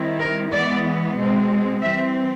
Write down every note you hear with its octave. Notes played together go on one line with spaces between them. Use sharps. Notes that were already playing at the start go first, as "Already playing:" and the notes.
Already playing: D#3 G3 C4 E4
A#4
E3 G#3 B3 D5
B2 G#3 C4
E3 G3 C4 E5